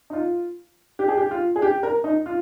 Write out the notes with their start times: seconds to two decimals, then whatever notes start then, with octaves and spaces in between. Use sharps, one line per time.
0.10 D#4
0.13 F4
0.99 G4
1.08 G#4
1.17 G4
1.31 F4
1.56 G#4
1.62 G4
1.83 A#4
2.04 D#4
2.26 F4